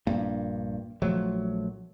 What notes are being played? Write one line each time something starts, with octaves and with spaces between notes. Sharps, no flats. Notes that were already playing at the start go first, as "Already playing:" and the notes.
A#1 G2 A#3
A#1 F3 F#3 A3